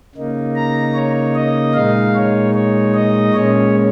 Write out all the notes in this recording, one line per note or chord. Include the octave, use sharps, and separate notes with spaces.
C#3 A#3 D#4
A#5
C#5
D#5
A#2 G#3 D#4 F5
C#5
C#5
D#5
A#2 G#3 C#4 C#5